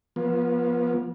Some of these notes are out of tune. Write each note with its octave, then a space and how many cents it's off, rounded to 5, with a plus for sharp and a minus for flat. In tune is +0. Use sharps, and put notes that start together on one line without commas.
F3 +0 B3 -35